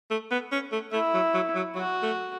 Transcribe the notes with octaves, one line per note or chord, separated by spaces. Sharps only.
A3
B3
C#4
A3
A3 E4
F#3
F#3
F#3
F#3 F#4
A3